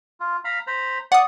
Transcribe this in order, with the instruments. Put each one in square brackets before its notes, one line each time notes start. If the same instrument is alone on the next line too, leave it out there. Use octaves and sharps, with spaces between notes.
[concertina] F4
F5 A#5 B5
C5 A#5 B5
[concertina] D5 C#6 [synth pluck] F#5 D#6